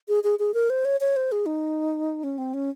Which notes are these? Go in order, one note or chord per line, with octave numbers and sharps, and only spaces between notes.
G#4
G#4
G#4
A#4
C5
C#5
C#5
C5
G#4
D#4
C#4
C4
C#4